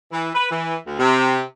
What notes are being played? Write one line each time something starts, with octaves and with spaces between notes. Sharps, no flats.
E3
B4
E3
D2
C3